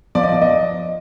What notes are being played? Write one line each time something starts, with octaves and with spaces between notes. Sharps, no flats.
F3 D5
D#5
D5
D#5